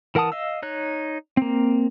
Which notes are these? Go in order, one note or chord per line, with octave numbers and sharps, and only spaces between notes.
E3 A#4 F#5 A5 D#6
D#5 F5 E6
D#4 C#5 F#6
A#3 C4